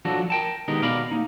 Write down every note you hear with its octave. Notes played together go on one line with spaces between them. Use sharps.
F3 F#3 D4 F#4 A4
A#4 G5 A5
D#3 G#3 B3 D#4 G4 A#4
B2 A#4 D5 F5 B5
A#3 D#4